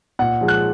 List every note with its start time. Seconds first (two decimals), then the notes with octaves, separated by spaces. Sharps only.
0.19 A#2 F#5
0.41 F3 G#3
0.48 F#6